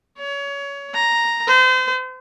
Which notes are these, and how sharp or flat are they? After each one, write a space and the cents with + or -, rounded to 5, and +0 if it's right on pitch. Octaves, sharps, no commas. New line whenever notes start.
C#5 +25
A#5 +0
C5 -35